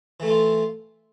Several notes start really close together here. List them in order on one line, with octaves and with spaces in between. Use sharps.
E3 A3 E4 A4 F4